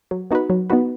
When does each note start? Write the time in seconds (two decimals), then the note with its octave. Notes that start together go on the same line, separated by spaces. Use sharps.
0.11 F#3
0.31 B3 D#4 F#4 B4
0.50 F#3
0.70 B3 D#4 F#4 B4